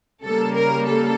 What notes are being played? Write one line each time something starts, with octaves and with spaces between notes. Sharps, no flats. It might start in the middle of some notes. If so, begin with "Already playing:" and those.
C#3 G3 A#3 A4
A#4
A4